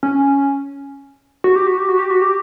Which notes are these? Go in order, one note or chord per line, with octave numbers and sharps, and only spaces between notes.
C#4
F#4
G4
F#4
G4
F#4
G4
F#4
G4